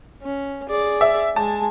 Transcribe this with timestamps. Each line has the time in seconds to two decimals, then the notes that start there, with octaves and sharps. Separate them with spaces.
0.22 C#4
0.69 G#4 D5
1.01 E5
1.36 G#3 G#5 A5